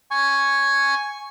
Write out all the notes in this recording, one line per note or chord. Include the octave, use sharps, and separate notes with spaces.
G#5 C#6